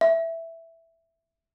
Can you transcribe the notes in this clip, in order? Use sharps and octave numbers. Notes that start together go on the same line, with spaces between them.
E5